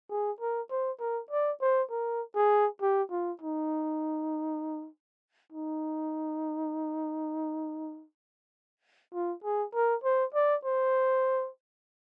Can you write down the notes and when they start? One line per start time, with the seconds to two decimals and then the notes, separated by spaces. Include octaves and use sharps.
0.10 G#4
0.41 A#4
0.71 C5
1.00 A#4
1.31 D5
1.62 C5
1.91 A#4
2.36 G#4
2.82 G4
3.11 F4
3.42 D#4
5.52 D#4
9.14 F4
9.44 G#4
9.74 A#4
10.04 C5
10.34 D5
10.65 C5